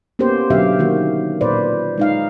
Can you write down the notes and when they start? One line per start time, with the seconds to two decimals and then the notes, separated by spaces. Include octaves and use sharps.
0.19 A#3 B3 C#4 G4 C5
0.50 B2 D3 F#3 G4 E5 F5
0.79 D#3 A#3 F#4
1.41 A#2 B4 C5 D5
1.98 G#3 D#4 F5